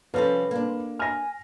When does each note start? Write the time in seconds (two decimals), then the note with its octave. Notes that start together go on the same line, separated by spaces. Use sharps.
0.14 C3 F3 G3 C4 C#4 A4 B4
0.51 A#3 D4
0.99 G#5 F6 A#6